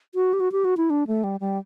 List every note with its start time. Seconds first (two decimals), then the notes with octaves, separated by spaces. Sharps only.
0.15 F#4
0.33 G4
0.40 F#4
0.52 G4
0.65 F#4
0.77 E4
0.90 D4
1.07 A3
1.24 G3
1.40 G3